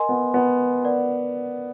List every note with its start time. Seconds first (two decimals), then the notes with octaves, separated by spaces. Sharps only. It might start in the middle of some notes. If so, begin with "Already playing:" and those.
Already playing: A#4 D#5 G#5 C6
0.09 B3
0.34 B3
0.84 A#4 D5 F#5